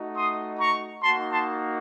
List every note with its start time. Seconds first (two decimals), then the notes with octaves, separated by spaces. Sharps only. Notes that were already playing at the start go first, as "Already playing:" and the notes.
Already playing: A3 D#4 F#4
0.16 C6 D#6
0.59 A#5 C#6
1.03 A#3 D#4 F#4 A5 C6
1.32 A5 C6